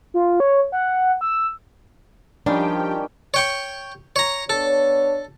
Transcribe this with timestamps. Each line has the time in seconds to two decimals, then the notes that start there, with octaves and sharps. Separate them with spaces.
0.14 F4
0.40 C#5
0.72 F#5
1.21 E6
2.46 D#3 F3 G3 C#4 D4 G4 G5
3.34 C#5 G5 C#6
4.16 C#5 A#5
4.50 B3 D4 A4 C#5